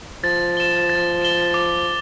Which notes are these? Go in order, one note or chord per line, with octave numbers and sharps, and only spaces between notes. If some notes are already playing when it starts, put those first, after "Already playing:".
F3 A6
E7 G7
A6
E7 G7
D6